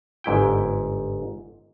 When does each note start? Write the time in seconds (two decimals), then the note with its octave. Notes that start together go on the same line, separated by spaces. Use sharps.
0.24 G1 G#2 E4 G5